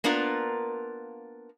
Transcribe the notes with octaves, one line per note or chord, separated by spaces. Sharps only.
A#3 B3 D4 F4 A#4